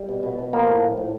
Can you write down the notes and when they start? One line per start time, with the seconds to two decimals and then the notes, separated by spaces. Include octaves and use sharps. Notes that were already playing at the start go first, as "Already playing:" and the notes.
Already playing: G3
0.09 B2
0.23 B2
0.39 B2
0.53 F3 A#3
0.68 A2
0.82 F3
0.98 A2